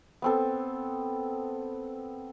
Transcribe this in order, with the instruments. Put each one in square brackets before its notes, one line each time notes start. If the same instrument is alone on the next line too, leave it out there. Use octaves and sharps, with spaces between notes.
[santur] B3 C4 A4